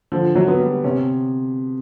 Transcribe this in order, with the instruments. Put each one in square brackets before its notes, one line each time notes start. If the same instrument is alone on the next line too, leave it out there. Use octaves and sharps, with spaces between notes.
[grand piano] D3 [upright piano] F3
[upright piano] F#3
[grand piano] B3
[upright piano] G3
[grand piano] C3 [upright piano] C#4